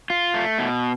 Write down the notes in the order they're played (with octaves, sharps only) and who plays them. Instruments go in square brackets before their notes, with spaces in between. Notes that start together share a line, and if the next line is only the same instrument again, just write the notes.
[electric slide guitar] F4
A3
B2